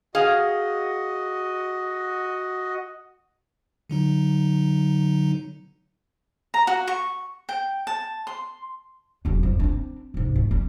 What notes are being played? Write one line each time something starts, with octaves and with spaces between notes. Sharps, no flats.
F#4 G#4 D#5 F5
D3 F#3 D#4
A#5
F#4
C#6
G5
A5
C6
E1 F#2
F2 G3
C4 D4
C2 G#2
A3
G3 C#4